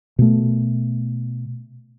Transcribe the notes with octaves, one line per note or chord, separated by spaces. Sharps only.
B2 A3